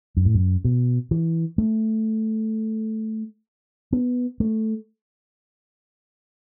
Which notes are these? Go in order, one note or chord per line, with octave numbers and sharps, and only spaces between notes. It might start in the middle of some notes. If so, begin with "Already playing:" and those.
F#2
A2
F#2
B2
E3
A3
B3
A3